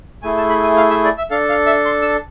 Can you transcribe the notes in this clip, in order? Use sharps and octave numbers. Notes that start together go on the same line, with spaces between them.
A3 E4 G#4 G#5
A5
B5
G#5
F5
E5
D5
E5
D4 A4 F5
F5
E5
C6
E6